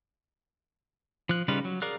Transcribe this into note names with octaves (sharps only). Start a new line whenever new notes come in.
F3 F#6
C#3 G3 D#4 F4 B4
F#3
G#4 A#4 D5 F5 F#6